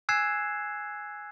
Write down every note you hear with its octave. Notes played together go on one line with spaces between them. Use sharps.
G#5 E6 F#6 G#6 C7 E7